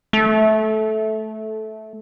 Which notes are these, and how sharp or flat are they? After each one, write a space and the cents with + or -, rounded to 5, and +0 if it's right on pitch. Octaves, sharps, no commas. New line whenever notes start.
A3 -15